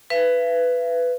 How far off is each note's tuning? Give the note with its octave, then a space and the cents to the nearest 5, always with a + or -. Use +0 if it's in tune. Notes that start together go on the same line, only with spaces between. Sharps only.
B4 +10 E5 +45